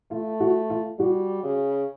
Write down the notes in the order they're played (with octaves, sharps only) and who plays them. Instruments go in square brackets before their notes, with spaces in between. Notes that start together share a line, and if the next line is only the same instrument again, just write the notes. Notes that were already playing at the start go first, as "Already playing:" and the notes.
[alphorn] A3 [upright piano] F4
[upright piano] F#4
F4
[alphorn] G3 [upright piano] F#4
[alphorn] C#3